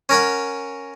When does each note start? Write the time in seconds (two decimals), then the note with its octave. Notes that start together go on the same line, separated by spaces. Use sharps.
0.09 C#4 A#4 C#5 F#5